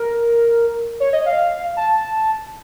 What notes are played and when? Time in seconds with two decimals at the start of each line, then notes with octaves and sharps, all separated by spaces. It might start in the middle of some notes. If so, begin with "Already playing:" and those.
Already playing: A#4
1.00 C#5
1.13 D#5
1.26 F5
1.77 A5